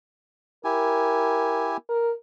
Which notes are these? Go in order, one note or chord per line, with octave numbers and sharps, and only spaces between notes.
E4 G4 A#4 G#5
A#4